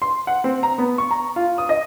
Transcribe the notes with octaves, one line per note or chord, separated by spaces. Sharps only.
C6
F#5
C4
A#5
B3
C#6
A#5
F4
D#6
D#5